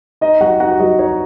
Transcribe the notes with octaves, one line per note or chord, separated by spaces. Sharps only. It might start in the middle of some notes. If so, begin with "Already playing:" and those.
D#4 D#5
F#3 F#4 F#5
D#4 F#4 F#5
F#3 D#5
D#4 C#5